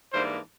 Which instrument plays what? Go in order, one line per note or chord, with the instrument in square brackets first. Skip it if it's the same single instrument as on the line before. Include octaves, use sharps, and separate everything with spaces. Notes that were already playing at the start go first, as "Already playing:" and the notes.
[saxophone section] G#2 E3 G3 A#3 D4 [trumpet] C5